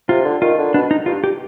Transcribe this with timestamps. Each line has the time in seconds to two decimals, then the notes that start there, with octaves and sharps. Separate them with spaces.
0.08 C3 F4
0.25 D3
0.42 D#3 F4
0.58 D3
0.74 B2 D4
0.91 D#4
1.06 G2 F4
1.24 G4